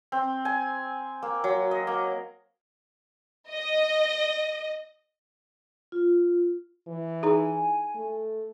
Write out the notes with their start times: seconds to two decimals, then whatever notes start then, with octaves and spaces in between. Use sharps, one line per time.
0.12 C4
0.45 G#5
1.23 A#3
1.44 F#3
1.71 D#5
1.87 A#3
3.50 D#5
5.92 F4
6.87 E3
7.23 D#4 G#4 G#5
7.95 A3